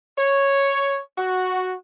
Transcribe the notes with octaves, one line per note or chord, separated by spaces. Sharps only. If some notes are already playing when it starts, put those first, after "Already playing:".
C#5
F#4